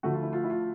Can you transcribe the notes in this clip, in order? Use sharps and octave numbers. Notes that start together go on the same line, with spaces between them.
D2 D3 F3 A3 F#4
F4
E4
F4
E4
F4